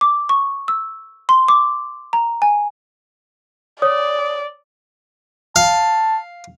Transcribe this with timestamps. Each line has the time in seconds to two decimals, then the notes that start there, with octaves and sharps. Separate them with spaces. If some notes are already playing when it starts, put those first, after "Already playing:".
0.01 D6
0.29 C#6
0.68 E6
1.29 C6
1.48 D6
2.13 A#5
2.42 G#5
3.82 C#5 D5 D#6
5.56 F5 A5